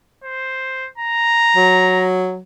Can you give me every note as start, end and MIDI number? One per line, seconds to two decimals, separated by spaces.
0.24 0.89 72
0.98 2.06 82
1.56 2.40 54